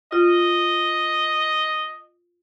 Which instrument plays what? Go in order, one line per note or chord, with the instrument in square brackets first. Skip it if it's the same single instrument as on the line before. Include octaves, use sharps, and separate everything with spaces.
[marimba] F4 [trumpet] D#5